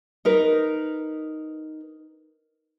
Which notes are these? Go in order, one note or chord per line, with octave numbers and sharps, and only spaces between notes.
D#4 A#4 B4